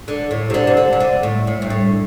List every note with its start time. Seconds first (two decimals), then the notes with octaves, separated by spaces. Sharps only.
0.08 D3
0.31 A2
0.50 C3
0.54 D3
0.67 C3
0.77 D3
0.93 C3
1.00 D3
1.23 A2
1.47 A2
1.62 G2
1.70 A2